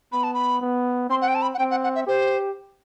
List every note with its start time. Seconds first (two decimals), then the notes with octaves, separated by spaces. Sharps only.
0.12 B3 B5
0.23 A5
0.34 B5
0.61 B3
1.10 C4 C6
1.22 F#5
1.28 G5
1.35 A5
1.42 B5
1.54 F#5
1.59 C4 G5
1.71 F#5
1.83 F#5
1.95 E5
2.07 G4 C5